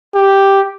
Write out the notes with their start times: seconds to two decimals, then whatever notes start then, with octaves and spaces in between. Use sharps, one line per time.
0.15 G4